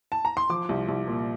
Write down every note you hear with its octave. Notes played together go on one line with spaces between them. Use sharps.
A5
A#5
C6
F3 D6
C2
C2
A#2